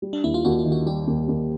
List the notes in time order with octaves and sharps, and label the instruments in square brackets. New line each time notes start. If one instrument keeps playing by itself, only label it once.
[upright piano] G3
[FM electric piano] D4
[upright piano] D#2 [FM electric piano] E4
[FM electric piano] F4
[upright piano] D#2 [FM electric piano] F#4
[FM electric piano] F4
[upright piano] D#3
[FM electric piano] F#4
[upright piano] G3 [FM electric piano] G4
[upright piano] D#2
D#2